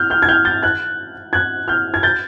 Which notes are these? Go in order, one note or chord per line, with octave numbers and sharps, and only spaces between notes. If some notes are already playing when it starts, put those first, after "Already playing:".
Already playing: F6 G6
F6 G6
G#6
F6 G6
G6 A6
F#6 G#6
F#6 G#6
F6 G6
G#6
G6 A6